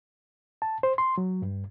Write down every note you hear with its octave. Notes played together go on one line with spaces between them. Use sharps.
A5
C5
C6
F#3
G2